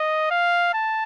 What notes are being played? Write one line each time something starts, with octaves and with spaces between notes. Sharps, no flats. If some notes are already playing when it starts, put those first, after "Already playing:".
Already playing: D#5
F5
A5